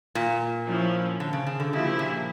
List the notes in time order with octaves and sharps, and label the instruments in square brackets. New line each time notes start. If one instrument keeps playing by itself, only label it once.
[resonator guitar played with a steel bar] A#2
[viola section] F3 C#4 E4
[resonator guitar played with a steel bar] D3
C#3
C#3
D3
[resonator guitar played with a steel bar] C#3 [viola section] F3 A#3 E4 G4
[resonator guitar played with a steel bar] A#2